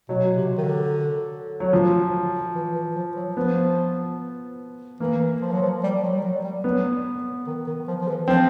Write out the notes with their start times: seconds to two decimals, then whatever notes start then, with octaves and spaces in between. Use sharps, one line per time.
0.09 B2 F#3
0.36 C3
0.58 D#3
0.63 D3
1.60 F#3
1.73 F3
2.55 E3
2.75 E3
2.96 F3
3.16 F#3
3.36 F3 B3
5.00 E3 A#3
5.41 F3
5.52 F#3
5.62 F3
5.83 G3
6.03 F#3
6.16 G3
6.24 F#3
6.43 G3
6.64 F#3 B3
7.47 D#3
7.67 D#3
7.87 F3
8.01 F3
8.08 E3
8.28 F3 C4